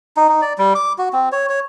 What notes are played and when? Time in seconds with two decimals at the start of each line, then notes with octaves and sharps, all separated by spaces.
0.17 D#4
0.29 D#4
0.42 D5
0.58 G3
0.75 D6
0.98 F#4
1.13 C4
1.32 C#5
1.49 C#5